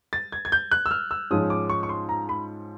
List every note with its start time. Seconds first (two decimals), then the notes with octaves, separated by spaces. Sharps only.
0.13 A6
0.32 G#6
0.45 G#6
0.52 G6
0.71 F#6
0.86 E6
0.91 F6
1.11 E6
1.31 G#2 F3 G#3 C#4 D#6
1.50 D6
1.70 C#6
1.83 C#6
1.89 C6
2.09 A#5
2.29 B5